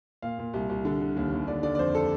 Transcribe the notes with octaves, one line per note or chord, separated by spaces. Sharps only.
A#2 F5
A#2
C2
C2
D3
D3
D#2
D#2
D3 D5
D3 D5
D5
F2 C5
A4